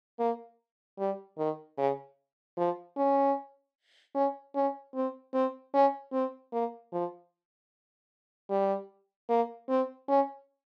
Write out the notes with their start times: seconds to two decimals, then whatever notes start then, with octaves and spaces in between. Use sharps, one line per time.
0.19 A#3
0.99 G3
1.38 D#3
1.78 C#3
2.57 F3
2.97 C#4
4.15 C#4
4.55 C#4
4.95 C4
5.34 C4
5.74 C#4
6.13 C4
6.53 A#3
6.93 F3
8.50 G3
9.29 A#3
9.69 C4
10.08 C#4